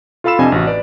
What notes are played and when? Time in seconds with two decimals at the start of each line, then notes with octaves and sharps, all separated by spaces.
0.24 F4 A4 F5 B5 E6 E7
0.39 F2 C3 D4 D#5 G#5
0.52 A1 F#4
0.67 B4 D5